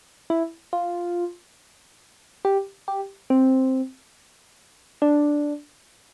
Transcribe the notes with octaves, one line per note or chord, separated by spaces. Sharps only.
E4
F4
G4
G4
C4
D4